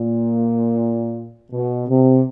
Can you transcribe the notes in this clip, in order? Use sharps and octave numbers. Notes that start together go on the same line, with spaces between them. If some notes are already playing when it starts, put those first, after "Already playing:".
Already playing: A#2
B2
C3